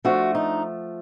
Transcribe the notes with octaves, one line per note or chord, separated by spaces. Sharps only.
F3 A3 D4 F#4
D#4